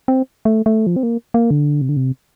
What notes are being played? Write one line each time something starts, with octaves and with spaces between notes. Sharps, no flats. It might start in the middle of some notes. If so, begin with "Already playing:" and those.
C4
A3
A3
F3
C4
A#3
A#3
D3
C3
D3
C3